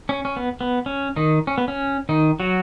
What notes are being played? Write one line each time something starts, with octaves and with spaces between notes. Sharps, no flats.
C#4
C#4
B3
B3
C#4
D#3 D#4
C#4
B3
C#4
D#3 D#4
F#3 F#4